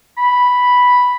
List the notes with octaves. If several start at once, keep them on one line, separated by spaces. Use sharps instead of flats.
B5